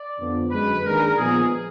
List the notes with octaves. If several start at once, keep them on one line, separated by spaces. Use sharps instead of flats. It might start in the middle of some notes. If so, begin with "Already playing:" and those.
Already playing: D5
F2 D3 F3 B3 D4
F#2 D3 G#3 B4
D#3 A#3 D4 G#4 A#4
A#2 F3 G#3 B3 G#4